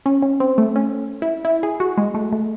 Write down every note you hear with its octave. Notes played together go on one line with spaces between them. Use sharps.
C#4
C#4
C4
A3
C#4
E4
E4
G#4
F#4
G#3
A3
A3